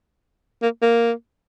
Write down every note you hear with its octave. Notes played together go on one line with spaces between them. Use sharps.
A#3
A#3